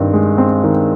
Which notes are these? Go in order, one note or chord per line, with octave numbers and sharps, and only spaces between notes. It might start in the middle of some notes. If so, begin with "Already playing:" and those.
Already playing: G2 D#3 C4
G#3
C4
D#3